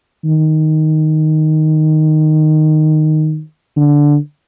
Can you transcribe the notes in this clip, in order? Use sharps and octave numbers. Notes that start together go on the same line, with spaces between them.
D#3
D3